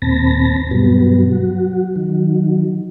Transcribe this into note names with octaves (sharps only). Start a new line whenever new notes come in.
D#2 A#2 C4 A5 B5 A#6
G2 B2 F#3 G3 B3
F#3 F#4
D#3 F#3